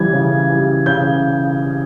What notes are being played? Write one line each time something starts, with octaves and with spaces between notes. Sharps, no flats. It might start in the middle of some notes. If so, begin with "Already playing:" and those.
Already playing: C#3 E3 G3 G#6
C#3
E3 G3
C#3 G6